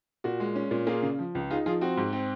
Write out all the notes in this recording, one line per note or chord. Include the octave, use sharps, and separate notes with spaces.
A#2 F#4
G#3
C#4
A#2
A#3 F4 G#4
C#3
F3
C#2
D#4 F4 G#4
F3 F4 G#4
C4 F#4
G#2
C4